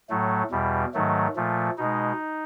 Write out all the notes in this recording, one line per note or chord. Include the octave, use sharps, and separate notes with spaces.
A2 F#3 A3
E2 B2 G3
G#2 D#3 F#3 A3
A#2 F3 A3
B2 G#3 D#4